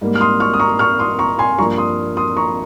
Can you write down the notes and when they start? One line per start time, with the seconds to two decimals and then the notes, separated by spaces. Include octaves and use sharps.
0.01 G#2 G3 A#3
0.15 F6
0.21 C6 D#6
0.40 C#6 F6
0.54 D#6
0.59 A#5 C#6
0.79 C#6 F6
0.99 C6 D#6
1.19 A#5 C#6
1.39 G#5 C6
1.58 G2 F3 A#3 A#5 C#6
1.78 C6 D#6
2.17 C6 D#6
2.37 A#5 C#6